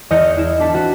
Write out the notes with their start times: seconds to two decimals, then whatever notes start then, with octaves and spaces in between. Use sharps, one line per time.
0.11 E2 D#5 F6 G6 A#6 C#7
0.37 E4 F6 C#7 E7
0.60 D4 A4 B6
0.73 C4 F#4